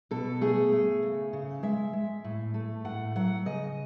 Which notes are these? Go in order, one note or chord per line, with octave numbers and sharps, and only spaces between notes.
B2 A4
A3 G#4
A3
C#3
C#3
G#3 E5
G#3
A2
A3
A2 F#5
F#3 F#5
C#3 D#5